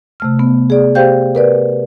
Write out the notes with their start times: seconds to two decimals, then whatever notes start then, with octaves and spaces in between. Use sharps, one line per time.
0.20 C3 A3 F6
0.39 B3
0.70 G#4 D5
0.95 G4 C5 F5 G5 G6
1.35 A#4 B4 D5